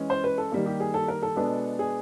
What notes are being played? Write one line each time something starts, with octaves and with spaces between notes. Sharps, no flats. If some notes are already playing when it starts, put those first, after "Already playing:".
Already playing: E3 G#3 C#4
C5
B4
A4
D#3 G3 A#3
G4
G#4
A4
A#4
A4
B2 G#3 B3 D4
G#4